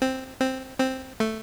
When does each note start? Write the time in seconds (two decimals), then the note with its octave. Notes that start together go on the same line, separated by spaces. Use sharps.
0.02 C4
0.41 C4
0.80 C4
1.20 A3